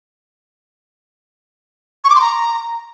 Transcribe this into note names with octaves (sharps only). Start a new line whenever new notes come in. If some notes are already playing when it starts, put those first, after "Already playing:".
C#6
D6
C6
A#5